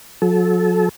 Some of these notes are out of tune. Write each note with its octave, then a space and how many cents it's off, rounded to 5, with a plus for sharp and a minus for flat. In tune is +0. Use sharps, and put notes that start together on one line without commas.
F#3 -45 A4 -25